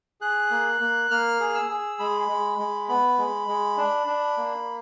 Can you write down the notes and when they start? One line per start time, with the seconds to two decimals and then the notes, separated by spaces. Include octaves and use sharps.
0.21 G#4 F#6
0.51 A#3
0.81 A#3
1.11 A#3 F6
1.40 G#4
1.55 E6
1.70 G#4
1.99 G#3 B5
2.29 G#3
2.59 G#3
2.89 B3 B5
3.18 G#3
3.48 G#3
3.77 D4
4.07 D4
4.37 A#3